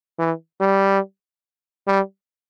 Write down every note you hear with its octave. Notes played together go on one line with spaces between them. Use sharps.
E3
G3
G3